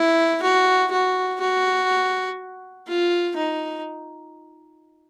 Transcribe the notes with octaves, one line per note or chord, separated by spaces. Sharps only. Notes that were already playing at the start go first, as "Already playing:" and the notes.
Already playing: E4
F#4
F#4
F#4
F4
D#4